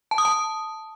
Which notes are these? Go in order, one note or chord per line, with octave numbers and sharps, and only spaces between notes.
A5
D#6
A5